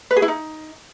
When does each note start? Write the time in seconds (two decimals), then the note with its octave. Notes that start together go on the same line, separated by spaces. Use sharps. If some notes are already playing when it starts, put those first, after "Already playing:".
0.11 B4
0.16 G#4
0.22 E4
0.28 D#4